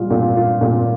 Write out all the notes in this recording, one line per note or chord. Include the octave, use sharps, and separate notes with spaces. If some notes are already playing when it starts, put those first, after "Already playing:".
Already playing: A#2 G3 F4
A#2
F4
A#2